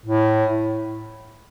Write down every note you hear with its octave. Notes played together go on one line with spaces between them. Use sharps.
A2